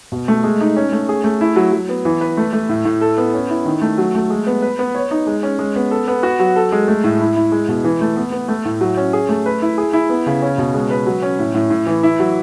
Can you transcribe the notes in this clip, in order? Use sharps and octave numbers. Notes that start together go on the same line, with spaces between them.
B2
A3
G#3
D#4
C#4
A3
G#4
A3
E4
F#3
F#3
B3
E3
B4
A3
A3
A2
A2
A4
B3
C#4
E4
D#3
A3
F#3
A3
G#3
B3
B4
B3
C#5
D#4
G#3
C#4
G#3
B3
A4
B3
F#4
F#3
A4
G#3
A3
A2
E4
E4
G#3
B2
E3
A3
B3
B3
A3
A2
F#3
C#4
G#4
A3
B4
E4
G#4
E4
B3
C#3
C#4
B2
G#3
B4
F#3
C#4
A2
A2
A2
E3
E4
F#3